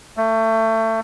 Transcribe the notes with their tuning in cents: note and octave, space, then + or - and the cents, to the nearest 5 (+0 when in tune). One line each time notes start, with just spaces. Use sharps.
A3 +25